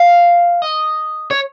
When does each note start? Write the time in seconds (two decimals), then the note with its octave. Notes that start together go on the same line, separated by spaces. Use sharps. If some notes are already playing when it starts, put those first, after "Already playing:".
Already playing: F5
0.62 D#5
1.31 C#5